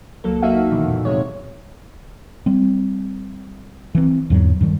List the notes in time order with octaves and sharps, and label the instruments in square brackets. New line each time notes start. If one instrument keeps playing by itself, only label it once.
[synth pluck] C#2 F#3 A#3 A4
A#3 D#4 F#4 E5 F5
G2 B2 D#3 E3
F2 A#2
C3 G#3 C#5
[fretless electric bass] G3 C4
E3 C4
E2 G#2 D3 F#3
G2 D#3 G3